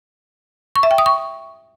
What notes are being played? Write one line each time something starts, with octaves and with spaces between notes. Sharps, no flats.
C#6
E5
G5
D#6
C#6